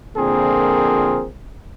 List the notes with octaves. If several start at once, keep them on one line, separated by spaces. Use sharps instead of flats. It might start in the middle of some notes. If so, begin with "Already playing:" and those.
A#2 D3 F3 C4 G#4 A#4